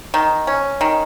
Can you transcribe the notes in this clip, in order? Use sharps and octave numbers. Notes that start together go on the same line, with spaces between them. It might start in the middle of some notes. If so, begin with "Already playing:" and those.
D#3
C#4
D#3